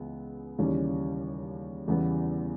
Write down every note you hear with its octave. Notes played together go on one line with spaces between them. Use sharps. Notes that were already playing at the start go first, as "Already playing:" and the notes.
Already playing: C#2 E3 G#3 B3
D#2 C#3 E3 G3 C#4
E2 C#3 E3 G3 B3